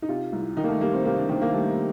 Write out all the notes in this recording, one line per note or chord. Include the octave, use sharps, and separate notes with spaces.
D#4
C3 F4
C2
D#3 D#4
A#3
A3
G3 A#3
C4
C3 A#3
D4
D#3 C4
A#3
G3 A3